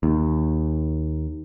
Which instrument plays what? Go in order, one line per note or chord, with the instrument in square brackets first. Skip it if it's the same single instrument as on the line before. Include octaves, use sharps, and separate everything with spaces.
[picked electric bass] D#2